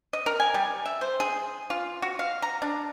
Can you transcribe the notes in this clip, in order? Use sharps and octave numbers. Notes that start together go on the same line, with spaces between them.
D#5
A#4
G#5
G3
E5
C5
G#4
F4
F#4
F5
A#5
D4